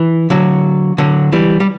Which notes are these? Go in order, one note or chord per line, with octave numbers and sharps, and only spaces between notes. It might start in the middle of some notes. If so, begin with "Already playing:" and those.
Already playing: E3
D3 F#3
D3 F#3
E3 G3
G3